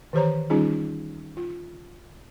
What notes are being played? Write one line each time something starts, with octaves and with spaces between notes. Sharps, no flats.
D#3 E3 G4 C5 C#5 A#5
D#3 G3 C#4 D#4 F4 G#4
F4